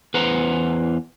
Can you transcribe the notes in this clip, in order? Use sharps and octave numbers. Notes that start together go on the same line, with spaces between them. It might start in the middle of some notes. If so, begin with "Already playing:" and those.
E2 B4 C5 F#5 A#5